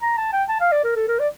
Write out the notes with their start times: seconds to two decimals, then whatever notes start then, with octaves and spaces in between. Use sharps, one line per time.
0.02 A#5
0.17 A5
0.32 G5
0.49 A5
0.60 F5
0.72 D5
0.84 A#4
0.96 A4
1.08 A#4
1.20 D5